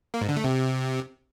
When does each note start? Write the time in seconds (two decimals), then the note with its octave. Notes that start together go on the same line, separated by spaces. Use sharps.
0.14 A#3
0.21 G#2
0.29 D3
0.36 A3
0.44 C3